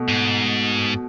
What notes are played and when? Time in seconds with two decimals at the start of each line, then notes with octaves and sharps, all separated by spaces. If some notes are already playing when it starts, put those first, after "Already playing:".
Already playing: B2 A3
0.08 G#2